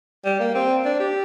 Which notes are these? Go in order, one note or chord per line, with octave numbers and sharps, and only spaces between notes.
G3
A#3
C4
D4
G4